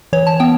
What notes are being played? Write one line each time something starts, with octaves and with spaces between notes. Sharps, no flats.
E3 C#5
A5
B3 G5